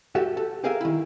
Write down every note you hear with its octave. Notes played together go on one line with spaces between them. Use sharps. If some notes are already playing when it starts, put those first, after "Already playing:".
F#4 G4 A4 E5
A4
G4 G#4 A#4 E5 F5 G#5
D#3 E4